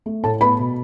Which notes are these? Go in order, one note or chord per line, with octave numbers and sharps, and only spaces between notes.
A3
A2 A4 A5
B3 B4 B5
B2